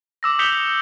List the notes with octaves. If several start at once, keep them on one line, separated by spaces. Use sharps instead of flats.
D6 E6 A#6
D#6 G6 B6 C#7 F7 G7